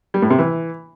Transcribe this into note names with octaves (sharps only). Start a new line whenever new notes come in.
G3
A2
C3
E3